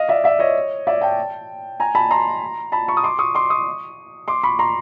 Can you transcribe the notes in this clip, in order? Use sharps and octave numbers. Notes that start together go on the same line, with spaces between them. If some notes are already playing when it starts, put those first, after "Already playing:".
Already playing: D#5 F5
D5 E5
D5 E5
C#5 D#5
D5 E5
G5 A5
G#5 A#5
A5 B5
A#5 C6
A5 B5
B5 C#6
D#6
C6 D6
C#6 D#6
C6 D6
C#6 D#6
C6 D6
B5 C#6
A#5 C6